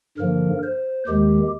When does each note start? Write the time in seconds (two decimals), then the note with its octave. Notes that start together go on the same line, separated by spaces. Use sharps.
0.18 G2 D3 F3 A#3 A#4
0.63 C5
1.07 D#2 D#3 G#3 G4